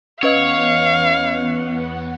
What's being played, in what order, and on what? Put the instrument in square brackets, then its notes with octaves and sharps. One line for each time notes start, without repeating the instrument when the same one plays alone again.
[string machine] E2 B3 F#5 [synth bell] C#4 B4 D#5 [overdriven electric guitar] C#5 [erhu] F5